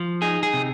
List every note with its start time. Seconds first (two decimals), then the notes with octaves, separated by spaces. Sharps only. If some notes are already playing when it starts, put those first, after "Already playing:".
Already playing: F3
0.22 D#4 G#4
0.43 G#4
0.53 C3